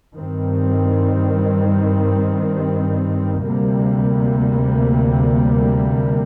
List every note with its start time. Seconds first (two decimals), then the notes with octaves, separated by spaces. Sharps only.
0.14 G2 D#3 G3 C4
3.45 D2 C3 G3 A#3